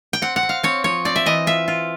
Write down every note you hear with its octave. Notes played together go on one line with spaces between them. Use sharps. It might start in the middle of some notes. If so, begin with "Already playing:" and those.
G5
C4 F#5
F#5
C4
F5
C4 C#5
F3 C#5
C4 D5
E5
E3 D#5
F4 E5
F4